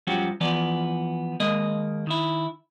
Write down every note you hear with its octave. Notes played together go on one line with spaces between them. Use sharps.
G2 F3 F#3 C#4 F#4 G4
E3 F3 B3 D5
D#2 G#3 A#3 D#5
D#3 E4